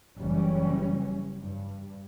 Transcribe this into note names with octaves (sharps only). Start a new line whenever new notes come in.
F#1 E3 G3 C#4
G2